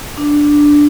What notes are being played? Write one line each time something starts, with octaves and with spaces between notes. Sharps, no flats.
D4